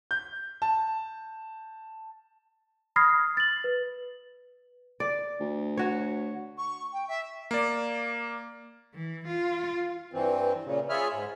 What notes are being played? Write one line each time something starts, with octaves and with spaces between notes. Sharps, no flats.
G6
A5
B5 D#6 F6 G#6 A#6 C7
A6 F#7
B4
D5
D2
F#4 C#5
C#6
G5
E5
A#3 D5
E3
F4
G2 E3 C4
A#2 C#3
F4 G#4 C#5 E5 B5 F6
G#2